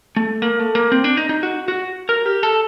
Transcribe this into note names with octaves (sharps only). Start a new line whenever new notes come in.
A3
A#3
A3
A#3
C4
D4
D#4
D#4
F#4
F#4
A#4
G4
A4